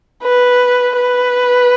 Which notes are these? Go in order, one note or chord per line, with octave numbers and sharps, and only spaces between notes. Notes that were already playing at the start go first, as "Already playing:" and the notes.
B4
B4